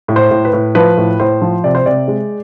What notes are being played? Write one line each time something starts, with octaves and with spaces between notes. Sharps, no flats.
A2
C5
A2
B4
A2
F3 B4
A2
A2 C5
F3
C3 D5
C5
C3 D5
G#3